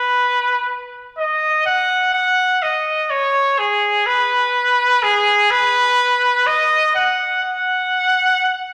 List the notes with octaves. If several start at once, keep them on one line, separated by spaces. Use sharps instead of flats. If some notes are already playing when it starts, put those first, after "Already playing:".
Already playing: B4
D#5
F#5
F#5
D#5
C#5
G#4
B4
G#4
B4
D#5
F#5
F#5